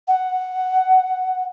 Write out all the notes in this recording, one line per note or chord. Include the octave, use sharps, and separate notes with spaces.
F#5